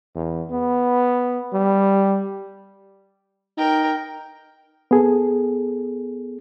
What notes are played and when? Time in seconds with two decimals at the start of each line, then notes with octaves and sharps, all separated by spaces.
0.15 E2
0.50 B3
1.53 G3
3.58 D#4 A#4 G5
4.91 B3 G#4 A4